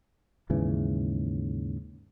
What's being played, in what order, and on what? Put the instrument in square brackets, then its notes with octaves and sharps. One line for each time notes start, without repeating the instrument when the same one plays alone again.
[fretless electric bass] D#2 G#2 C#3 E3